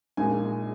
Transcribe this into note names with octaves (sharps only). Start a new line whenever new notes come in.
A#1 A#2 G#3 D#4 G#5